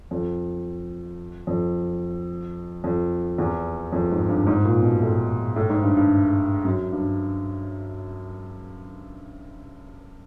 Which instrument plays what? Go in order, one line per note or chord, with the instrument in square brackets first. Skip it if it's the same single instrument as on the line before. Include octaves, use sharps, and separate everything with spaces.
[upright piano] F2
F2
F2
E2
F2
G#2
G2
G#2
A#2
B2
A2
A2
G#2
G2
G2
F#2
G2